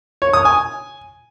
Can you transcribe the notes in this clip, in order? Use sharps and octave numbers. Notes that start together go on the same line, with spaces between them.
C#5
D#6
G#5